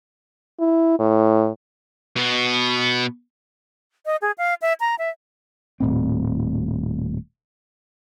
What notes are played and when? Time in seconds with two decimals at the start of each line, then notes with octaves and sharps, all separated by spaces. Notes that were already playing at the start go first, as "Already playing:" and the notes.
0.60 E4
0.99 A2
2.16 B2 B3
4.06 D#5
4.22 G#4
4.38 F5
4.62 E5
4.80 A#5
4.99 E5
5.80 D#1 A2 C4